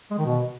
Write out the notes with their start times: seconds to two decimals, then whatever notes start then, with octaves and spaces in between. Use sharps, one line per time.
0.11 G#3
0.18 D#3
0.25 B2